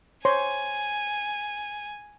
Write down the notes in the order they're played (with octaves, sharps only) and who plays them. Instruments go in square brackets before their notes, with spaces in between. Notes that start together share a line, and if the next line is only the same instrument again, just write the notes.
[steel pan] C5 C#5 C6 [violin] G#5